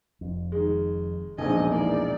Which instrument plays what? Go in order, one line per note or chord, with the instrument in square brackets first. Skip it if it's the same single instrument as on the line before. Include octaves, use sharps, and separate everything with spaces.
[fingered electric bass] F1 F2
[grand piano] D#3 G#3
[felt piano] E1 A#1 G#5 [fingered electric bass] C#3 [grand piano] C4 D#4 A4 [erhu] D#5
[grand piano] E3 A#3 D#4 [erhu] D5